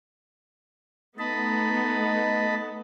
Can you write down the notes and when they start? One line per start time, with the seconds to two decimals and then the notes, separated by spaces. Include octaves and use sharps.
1.19 A3 B3 D#4 D#5 A5 B5